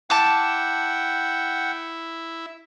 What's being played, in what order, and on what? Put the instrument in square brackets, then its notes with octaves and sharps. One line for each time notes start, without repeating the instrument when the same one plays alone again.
[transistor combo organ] E4 [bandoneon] F#5 G5 [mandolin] A5 D6